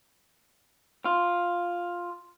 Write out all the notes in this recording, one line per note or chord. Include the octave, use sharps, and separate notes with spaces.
F4